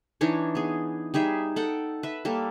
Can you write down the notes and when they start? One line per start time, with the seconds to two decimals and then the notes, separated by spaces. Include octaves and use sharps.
0.21 E3 D4 D#4 C#5
0.55 B3 G#4
1.14 G3 D#4 G#4 E5
1.56 A4 F#5 G5
2.03 B4 E5
2.25 G3 A#3 A4